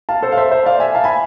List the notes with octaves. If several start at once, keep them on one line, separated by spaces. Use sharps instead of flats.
F5 A5
A4 C5
F5
C5 E5
C5 E5
D5 F5
E5 G#5
F5 A5
G#5 B5